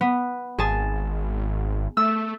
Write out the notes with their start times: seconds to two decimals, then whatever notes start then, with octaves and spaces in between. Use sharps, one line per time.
0.01 B3
0.58 G#1 G#4 A5
1.97 A3 E6